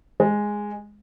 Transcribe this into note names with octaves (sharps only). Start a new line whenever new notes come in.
G#3